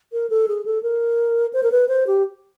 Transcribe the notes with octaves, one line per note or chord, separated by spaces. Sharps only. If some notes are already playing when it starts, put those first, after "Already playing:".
A#4
A4
G#4
A4
A#4
C5
A#4
B4
C5
G4